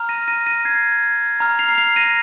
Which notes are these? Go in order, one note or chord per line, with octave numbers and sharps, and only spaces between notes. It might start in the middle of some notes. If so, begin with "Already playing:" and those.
Already playing: A#5 F6
A#6 D#7
A#6 D#7
A#6 D#7
G#6 C7
G#6
A#5 F6
C7 F7
C7 F7
A#6 D#7